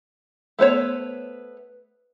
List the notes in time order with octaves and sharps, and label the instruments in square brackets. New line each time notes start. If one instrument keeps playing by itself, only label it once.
[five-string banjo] A3 B3 C5 C#5